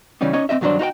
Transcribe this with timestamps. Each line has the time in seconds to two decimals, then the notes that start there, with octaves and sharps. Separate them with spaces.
0.21 C#3 E3 G3 C#4 D#4
0.33 C#4 D#4 C#5 D#5
0.49 C4 E4 D#5 E5
0.61 G2 D#3 F#3 G3 D4 C5
0.79 D#4 F#4 C5 G5